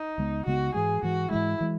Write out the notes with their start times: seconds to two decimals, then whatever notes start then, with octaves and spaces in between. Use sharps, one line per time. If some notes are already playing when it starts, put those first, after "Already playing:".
Already playing: D#4
0.18 C#2 C#3 G#3 B3
0.46 C#2 C#3 G#3 B3 F#4
0.74 G#2 E3 G#3 G#4
1.03 G#2 E3 G#3 F#4
1.30 G#2 E3 G#3 E4
1.61 E3 G#3